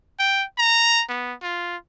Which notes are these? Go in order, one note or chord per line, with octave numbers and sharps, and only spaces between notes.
G5
A#5
B3
F4